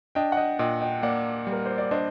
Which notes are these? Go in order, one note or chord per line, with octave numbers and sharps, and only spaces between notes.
D4 D#5 G5
F#5
D#5 G5
A#2 D#5 G5
D#5 G5
A#3 D5 F#5
G3
A#4
C5
D5
D4 C5 D#5